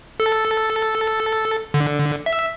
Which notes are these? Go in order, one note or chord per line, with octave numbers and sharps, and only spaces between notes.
A4
D3
E5